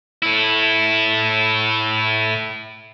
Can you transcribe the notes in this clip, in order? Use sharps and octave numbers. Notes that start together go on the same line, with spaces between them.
A2 E4